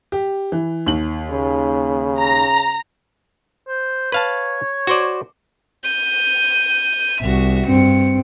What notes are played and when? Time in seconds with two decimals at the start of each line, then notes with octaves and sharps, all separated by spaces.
0.12 G4
0.52 E3
0.86 D#2 F#7
1.31 C#3
2.19 A#5
3.68 C5
4.12 B4 C#5 F5 A5
4.87 F#4 C5 D5
5.84 G6 D#7
7.21 C2 F#4 E5
7.67 G2 C4 C#7